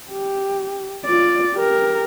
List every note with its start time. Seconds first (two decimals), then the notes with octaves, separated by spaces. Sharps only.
0.11 G4
1.05 F4 D5
1.54 G4 A#4